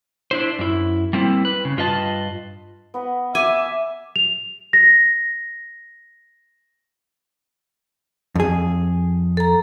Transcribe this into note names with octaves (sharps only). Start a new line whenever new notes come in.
D4 E4 C5
F#2 E4
G3 A#3 C4 E4
B4
C#3
G2 F4 B4 D#5 A5
B3 B4 D#5
E5 G#5 D6
F7
A#6
F2 G#4
A4 A#5